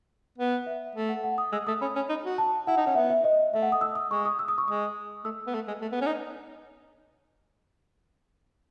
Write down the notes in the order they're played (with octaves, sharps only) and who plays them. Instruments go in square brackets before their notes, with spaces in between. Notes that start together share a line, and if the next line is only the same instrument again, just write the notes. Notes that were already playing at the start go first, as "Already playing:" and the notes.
[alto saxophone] B3
[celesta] E5
[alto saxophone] A3
[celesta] F#5
F#5
D#6
[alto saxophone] G#3 [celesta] E6
[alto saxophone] A3 [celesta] D#6
[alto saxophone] C#4 [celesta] B5
[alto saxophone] C#4
D#4
F#4
[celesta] A5
[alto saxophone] E4 [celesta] F#5
[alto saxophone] D#4
[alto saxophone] C#4 [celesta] F#5
[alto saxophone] B3 [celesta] E5
[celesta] E5
D#5
[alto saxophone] A3 [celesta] E5
[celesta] F#5
D#6
E6
D#6
[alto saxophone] G#3 [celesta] C#6
[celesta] D#6
E6
D#6
C#6
[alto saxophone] G#3 [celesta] D#6
[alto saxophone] A3 [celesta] E6
[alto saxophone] B3
A3
G#3
A3
B3
C#4
D#4